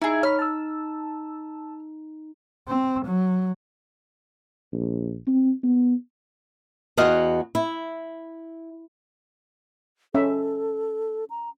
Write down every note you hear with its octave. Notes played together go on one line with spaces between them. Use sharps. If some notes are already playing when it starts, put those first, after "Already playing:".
D#4 E4 G#4
C#5 B5 F6
A5 E6
C4
F#3
A#1
C4
B3
E2 F#4 D#5 F5 F#5
E4
C#4 A4 E5
A#5